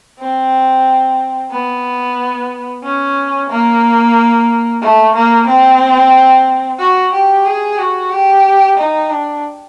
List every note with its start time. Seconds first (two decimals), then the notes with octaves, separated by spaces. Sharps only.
0.20 C4
1.51 B3
2.84 C#4
3.50 A#3
4.81 A3
5.15 A#3
5.47 C4
6.79 F#4
7.13 G4
7.46 G#4
7.78 F#4
8.11 G4
8.78 D#4
9.10 D4